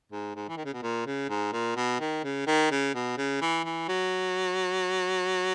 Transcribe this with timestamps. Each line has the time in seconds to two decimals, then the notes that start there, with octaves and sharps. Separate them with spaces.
0.12 G#2
0.36 G#2
0.49 E3
0.57 D#3
0.65 C#3
0.74 B2
0.83 A#2
1.06 C#3
1.29 G#2
1.53 A#2
1.76 B2
2.00 D#3
2.24 C#3
2.47 D#3
2.71 C#3
2.94 B2
3.18 C#3
3.41 E3
3.65 E3
3.89 F#3